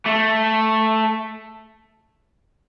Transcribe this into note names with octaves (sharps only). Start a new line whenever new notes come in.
A3